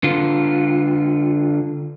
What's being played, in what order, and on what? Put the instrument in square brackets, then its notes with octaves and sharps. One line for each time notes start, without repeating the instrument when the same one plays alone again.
[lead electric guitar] D3 F4